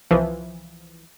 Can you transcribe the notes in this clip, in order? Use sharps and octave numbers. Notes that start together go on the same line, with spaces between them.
C2 E3 F3